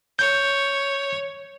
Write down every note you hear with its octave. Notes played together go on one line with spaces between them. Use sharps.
C#5 G6